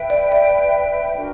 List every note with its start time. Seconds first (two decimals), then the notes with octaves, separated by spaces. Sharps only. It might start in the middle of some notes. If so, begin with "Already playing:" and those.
Already playing: B4 E5 G5
0.10 D5
0.32 D5
1.16 D4 F#4 A#4